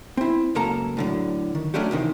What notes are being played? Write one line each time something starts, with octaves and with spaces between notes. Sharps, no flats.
C4 E4
C#2 F#2 A#3 A4 A#5
A2 D3 F#3
D#3
F#3 A3 C#4 D4 F#4 G4
E2 C3 D#3